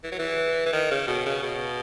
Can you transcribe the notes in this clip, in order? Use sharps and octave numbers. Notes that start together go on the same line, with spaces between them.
E3
F#3
E3
E3
D#3
C#3
B2
C#3
B2